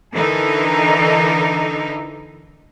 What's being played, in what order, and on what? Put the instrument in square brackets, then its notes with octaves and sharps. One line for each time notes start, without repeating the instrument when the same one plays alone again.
[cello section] D3 E3 D#4 A4 A#4